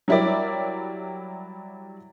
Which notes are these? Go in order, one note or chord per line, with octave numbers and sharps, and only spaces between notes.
F#3 G3 E4 A#4 D5